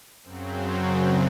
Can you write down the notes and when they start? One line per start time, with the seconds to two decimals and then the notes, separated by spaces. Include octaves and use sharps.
0.23 F#2 C#3 F#3 C4